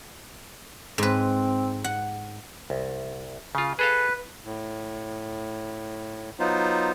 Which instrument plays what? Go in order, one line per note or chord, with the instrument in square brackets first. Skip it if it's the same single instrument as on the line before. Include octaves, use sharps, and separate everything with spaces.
[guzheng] G#2 B4 [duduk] C4
[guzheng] F#5
[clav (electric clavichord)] C2
C#3 F4
[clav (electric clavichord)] G#4 A4 F5 [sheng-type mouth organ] B4
[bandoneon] A2
F#3 B3 D#4 F4 C5